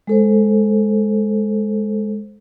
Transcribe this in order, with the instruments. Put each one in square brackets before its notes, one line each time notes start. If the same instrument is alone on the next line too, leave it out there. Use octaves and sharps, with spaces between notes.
[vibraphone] G#3 A4 C5